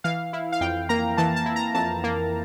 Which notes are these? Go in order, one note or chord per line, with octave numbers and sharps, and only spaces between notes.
E3 F5
E4
F5
F2 G5
A#3 A#5
E3 A5
A5
E4
A#5
F2 A5
A#3